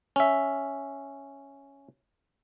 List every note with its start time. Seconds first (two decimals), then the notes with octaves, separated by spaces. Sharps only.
0.16 C#4 E5